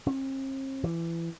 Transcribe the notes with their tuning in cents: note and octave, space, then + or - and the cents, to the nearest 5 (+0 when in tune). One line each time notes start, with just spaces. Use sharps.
C4 +45
E3 +25